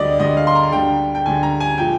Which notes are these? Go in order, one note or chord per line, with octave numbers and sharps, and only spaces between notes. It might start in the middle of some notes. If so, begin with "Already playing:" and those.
Already playing: D2 D3 G3 D5 D#5
D2 D3 G3 D#5
F5
C6
A#5
D2 D3 G3 G5
G5
D2 D3 G3 G#5
A#5
G#5
A#2 F3 G#3 G5